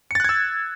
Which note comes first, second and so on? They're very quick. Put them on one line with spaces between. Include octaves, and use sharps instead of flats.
C#7 A6 F#6 G#6 E6